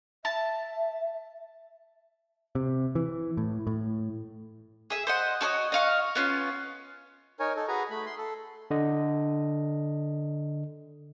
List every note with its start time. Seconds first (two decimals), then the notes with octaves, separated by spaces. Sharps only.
0.25 E5 A5
2.55 C3
2.95 E3
3.37 A2
3.67 A2
4.90 G#4 E5
5.07 C5 D#5 F#5
5.41 F#4 A4 C#5 D#5
5.72 D#5 F5 C#6
6.15 B3 C#4 F4
7.40 D#4 A#4 C#5 G#5
7.56 D#4 A4
7.68 F#4 G#4 B4 G#5 A#5
7.90 A3 B5
8.06 C6
8.18 A4
8.71 D3 D#5